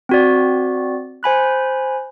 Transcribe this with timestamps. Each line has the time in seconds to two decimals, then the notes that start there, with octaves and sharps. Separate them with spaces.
0.09 C4 F#4 D5
1.23 C5 G#5 B5 F#6